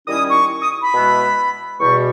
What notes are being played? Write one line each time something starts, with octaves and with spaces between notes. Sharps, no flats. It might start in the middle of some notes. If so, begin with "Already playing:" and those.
D#3 G3 C#4 E4 D#6
C#6
D#6
B5
B2 G#3 B3 E4
E2 B2 G3 C#6